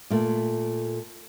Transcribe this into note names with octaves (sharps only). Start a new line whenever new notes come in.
A#2 A3